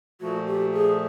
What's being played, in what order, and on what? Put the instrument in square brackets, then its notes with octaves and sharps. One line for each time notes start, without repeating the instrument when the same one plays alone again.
[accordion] A#2 F3 A3 [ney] F#4
[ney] G4
G#4